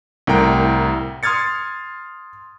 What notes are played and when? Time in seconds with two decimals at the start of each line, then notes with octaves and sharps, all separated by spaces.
0.27 C2 A2 A#4 G5 A#5 D7
1.23 C6 D#6 F6 G#6 A6 C#7